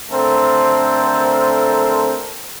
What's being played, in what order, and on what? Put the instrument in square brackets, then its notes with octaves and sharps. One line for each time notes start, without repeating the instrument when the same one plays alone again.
[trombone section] D3 A3 C4 A4 A#4 C5